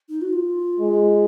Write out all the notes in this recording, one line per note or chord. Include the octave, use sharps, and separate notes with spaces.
D#4
F#4
F4
G#3